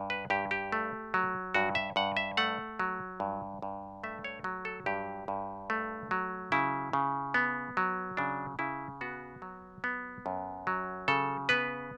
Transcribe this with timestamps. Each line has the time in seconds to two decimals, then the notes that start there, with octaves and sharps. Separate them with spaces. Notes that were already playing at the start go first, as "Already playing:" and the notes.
Already playing: G2
0.10 B4
0.30 G2 G4
0.51 G4
0.72 A3
1.14 F#3
1.54 G2 F#4
1.75 E5
1.96 G2 F#5
2.17 E5
2.37 A3 F#5
2.79 F#3
3.20 G2
3.62 G2
4.04 A3 E5
4.24 C#5
4.44 F#3
4.65 A4
4.86 G2 G4
5.28 G2
5.70 A3
6.11 F#3
6.52 C#3 E4
6.93 C#3
7.34 B3
7.77 F#3
8.17 C#3 D4
8.59 C#3 E4
9.01 B3 F#4
9.42 F#3
9.84 B3
10.26 F#2
10.67 F#3
11.08 C#3 A4
11.49 B3 B4